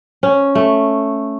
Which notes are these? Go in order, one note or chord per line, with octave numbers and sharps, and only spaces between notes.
C#4
A3